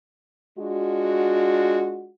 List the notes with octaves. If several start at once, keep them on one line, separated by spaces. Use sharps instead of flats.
G#3 D4 F4 F#4